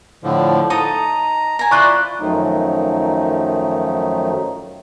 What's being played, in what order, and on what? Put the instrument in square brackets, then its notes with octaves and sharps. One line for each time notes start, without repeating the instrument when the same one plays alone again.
[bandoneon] A2 D3 F3
[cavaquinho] D#4 A4 D#6 [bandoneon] A#5
[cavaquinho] G#5 A#5
[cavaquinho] E4 F4 C5 [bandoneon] D5 [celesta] C#6 F#6
[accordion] F#2 D#3 F3 F#3 A3 D#4